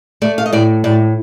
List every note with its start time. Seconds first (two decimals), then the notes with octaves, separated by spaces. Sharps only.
0.22 A3 D5
0.38 F5
0.46 D#5
0.53 A2 D5
0.84 A2 D5